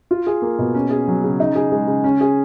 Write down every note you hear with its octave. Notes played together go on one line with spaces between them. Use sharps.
F4
G#4
A#3
B2
C#4
G#4
F#3
C#3
D#4
G#4
G#3
C#3
C#4
G#4